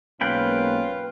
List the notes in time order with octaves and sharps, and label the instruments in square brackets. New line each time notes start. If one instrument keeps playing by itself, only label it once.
[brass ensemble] B1 G#2 A#3 [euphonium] C#4 [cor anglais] F4 [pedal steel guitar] B4 G5 B5